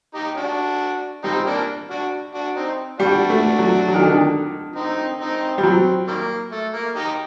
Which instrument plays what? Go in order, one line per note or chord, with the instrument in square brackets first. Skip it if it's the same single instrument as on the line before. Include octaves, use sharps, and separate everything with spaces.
[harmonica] D#4 G4
D4 F#4
[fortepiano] G3 [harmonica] C4 D#4
[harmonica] A#3 D4
D4 F#4
D4 F#4
C4 D#4
[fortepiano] G3 [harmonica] D4 F#4
[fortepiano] A3
F#3
F#3
D#3
D3
D#3
[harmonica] C4 D#4
C4 D#4
[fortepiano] G3
[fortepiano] F#3 [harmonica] C4
[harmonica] D#3 G3 A#3
A3
A#3
D#4 G4